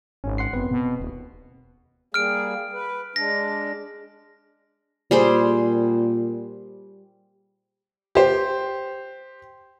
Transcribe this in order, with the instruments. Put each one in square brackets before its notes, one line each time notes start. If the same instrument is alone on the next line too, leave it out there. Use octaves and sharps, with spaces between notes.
[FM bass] G#1 [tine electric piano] C#4
[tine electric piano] F#5 C6 C7
[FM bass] F#1 [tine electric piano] B3 C4 B4
[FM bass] B2
D#1
[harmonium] G3 A#3 G#4 [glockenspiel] F6 D7
[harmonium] B4
[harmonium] G#3 D4 [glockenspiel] A#6
[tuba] A#2 [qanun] G3 G#4 C5
[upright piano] G4 C5